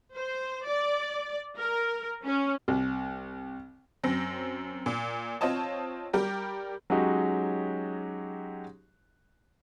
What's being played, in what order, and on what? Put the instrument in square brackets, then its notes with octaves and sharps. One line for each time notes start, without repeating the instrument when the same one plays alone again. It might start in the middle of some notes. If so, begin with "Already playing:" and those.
[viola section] C5
D5
A#4
C#4
[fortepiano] C2
[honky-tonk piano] F#2 C4 A#6
A#2
C4 F4 C#5 D#5 A5
G3 G4 A#4
[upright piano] F#3 G#3 C#4 D#4 F#4 G4